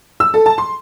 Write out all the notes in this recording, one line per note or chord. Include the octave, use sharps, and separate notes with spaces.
E6
A4
A5
C6